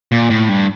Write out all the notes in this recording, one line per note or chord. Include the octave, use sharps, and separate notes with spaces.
A#2
A2
G2